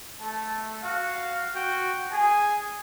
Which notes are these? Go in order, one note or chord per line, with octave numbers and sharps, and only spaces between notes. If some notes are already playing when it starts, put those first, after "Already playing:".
A3 A5
F#4 F5
F#4 G5
G#4 G#5